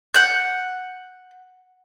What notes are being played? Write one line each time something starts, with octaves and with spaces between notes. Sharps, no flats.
F#5 G6